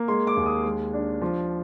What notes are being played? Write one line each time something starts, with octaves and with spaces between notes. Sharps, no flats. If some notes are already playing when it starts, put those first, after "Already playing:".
Already playing: A#3
G#3 C6
D6
D#2
D#6
G#3
D4
F3